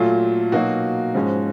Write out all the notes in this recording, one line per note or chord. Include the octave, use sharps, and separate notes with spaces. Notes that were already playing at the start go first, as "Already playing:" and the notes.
Already playing: A#2 F#3 A3 F4
B2 F#3 A#3 D#4 F#4
G#2 F3 G#3 C#4